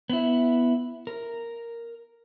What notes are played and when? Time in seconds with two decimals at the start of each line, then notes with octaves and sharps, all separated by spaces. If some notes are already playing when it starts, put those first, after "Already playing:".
0.10 B3 E4
1.07 A#4